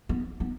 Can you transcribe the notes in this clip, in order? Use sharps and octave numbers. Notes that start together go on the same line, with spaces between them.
B3
B3